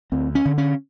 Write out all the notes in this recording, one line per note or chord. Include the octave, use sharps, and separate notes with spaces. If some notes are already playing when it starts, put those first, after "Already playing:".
D2 C4
C#4
D3
C#4